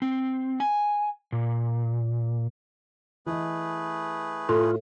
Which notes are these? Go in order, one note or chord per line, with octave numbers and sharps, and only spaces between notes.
C4
G#5
A#2
E3 A3 G#4 B4 D#5
A2 F4 A4